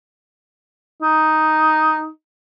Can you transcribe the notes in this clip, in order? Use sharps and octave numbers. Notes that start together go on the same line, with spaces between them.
D#4